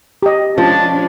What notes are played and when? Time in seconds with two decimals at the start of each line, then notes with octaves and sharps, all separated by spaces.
0.23 G4 D#5
0.58 F3 G#3 C#4 D4 A5